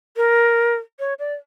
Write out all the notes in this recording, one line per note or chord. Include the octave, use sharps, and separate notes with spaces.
A#4
C#5
D5